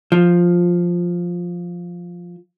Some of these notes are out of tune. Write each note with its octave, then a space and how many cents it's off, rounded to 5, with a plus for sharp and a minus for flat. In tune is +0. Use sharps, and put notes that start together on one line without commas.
F3 +5